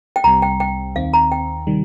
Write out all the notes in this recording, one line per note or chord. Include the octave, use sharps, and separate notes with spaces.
G5
C2 C3 G3 C4 A#5
G5
G5
D#2 D#3 C4 F5
A#5
G5
C3 D#3 G3